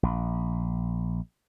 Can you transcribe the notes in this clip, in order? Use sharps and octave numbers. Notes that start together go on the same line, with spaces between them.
A#1